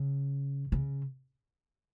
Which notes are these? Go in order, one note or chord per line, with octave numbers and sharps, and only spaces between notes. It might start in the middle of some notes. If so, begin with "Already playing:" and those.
Already playing: C#3
C#3